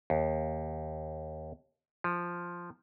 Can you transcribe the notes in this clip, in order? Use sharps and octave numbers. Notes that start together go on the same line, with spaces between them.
D#2
F3